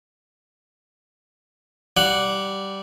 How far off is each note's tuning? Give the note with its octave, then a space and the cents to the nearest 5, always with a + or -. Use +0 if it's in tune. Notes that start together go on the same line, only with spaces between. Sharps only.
G3 -10 F#5 +0